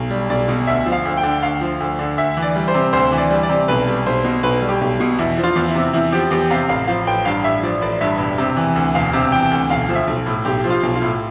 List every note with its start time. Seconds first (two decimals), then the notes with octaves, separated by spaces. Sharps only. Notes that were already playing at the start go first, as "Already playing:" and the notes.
Already playing: B1
0.11 G3
0.30 B1 D5
0.48 B2
0.67 D2 E5
0.86 F3
0.92 F5
1.05 D2
1.17 G5
1.23 D3
1.43 D2 F5
1.61 F3
1.80 D2
1.99 D3
2.18 D2 E5
2.37 E3
2.42 D5
2.56 G3
2.68 C5
2.74 C3
2.93 D2 C5
3.12 E3
3.18 D5
3.30 G3
3.43 D5
3.49 C3
3.68 B1 B4
3.87 G3
4.06 B1 C5
4.25 B2
4.43 B1 B4
4.62 G3
4.69 G4
4.81 B1
5.00 B2
5.19 E2 E4
5.38 F3
5.44 F4
5.56 E2
5.69 E4
5.75 C3
5.93 E2 E4
6.12 F3 G4
6.31 E2 G4
6.51 C3 F5
6.69 A1 F5
6.87 F3 F5
7.07 A1 G5
7.25 G2 F5
7.44 A1 E5
7.63 F3 D5
7.82 A1 D5
8.01 G2 E5
8.20 E1
8.38 C3
8.57 E3
8.76 D2
8.95 E1 F5
9.13 C3
9.32 E3 G5
9.51 D2
9.70 B1 F5
9.89 F3
9.95 E5
10.07 B1
10.26 A2
10.45 B1 G4
10.64 F3
10.70 F4
10.83 B1
10.96 F4
11.02 A2